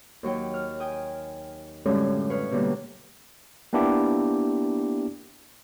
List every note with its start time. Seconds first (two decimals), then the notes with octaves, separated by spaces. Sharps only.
0.23 D#2 F#3 C#5 G5
0.54 F6
0.80 G5 G#5 D#6
1.85 F#2 A2 D3 G3 G#3 C#4
2.30 B4 C#5 F5
2.51 B2 D3 E3 G3 A#3
3.73 A#3 B3 D4 E4 G4